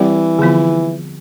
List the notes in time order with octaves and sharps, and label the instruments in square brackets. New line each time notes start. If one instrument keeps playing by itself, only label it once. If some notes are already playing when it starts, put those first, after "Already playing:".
Already playing: [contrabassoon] E3 [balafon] G3 C4 G4 D5
[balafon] D3 F3 B3 F4